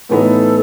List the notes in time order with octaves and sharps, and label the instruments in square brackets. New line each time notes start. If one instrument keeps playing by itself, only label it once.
[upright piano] A2 E3 B3 D#4 [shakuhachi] A4 B4